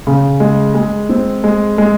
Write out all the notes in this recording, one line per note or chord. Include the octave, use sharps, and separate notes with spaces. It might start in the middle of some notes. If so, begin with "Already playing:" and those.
C#3
G#3
G#3
C4
G#3
G#3